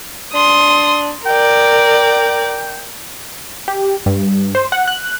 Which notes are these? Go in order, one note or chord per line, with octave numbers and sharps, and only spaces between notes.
D4 C6 D#6
A#4 D5 G5
G4
G2
C5
F#5
F#6